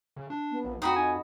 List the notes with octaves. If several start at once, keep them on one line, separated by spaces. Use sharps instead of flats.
C#3
D4
B3
A#1
F2 D#4 F#4 G5 B5 D#6
D#4 G#5